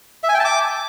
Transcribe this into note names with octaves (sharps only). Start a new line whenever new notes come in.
E5
G#5
G5
A5
D6